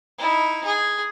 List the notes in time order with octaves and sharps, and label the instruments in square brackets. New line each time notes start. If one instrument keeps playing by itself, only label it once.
[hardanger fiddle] D#4 E4
G#4